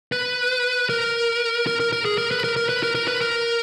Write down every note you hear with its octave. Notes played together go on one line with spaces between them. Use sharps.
B4
A#4
A#4
A#4
A#4
G#4
A#4
B4
A#4
A#4
B4
A#4
A#4
B4
A#4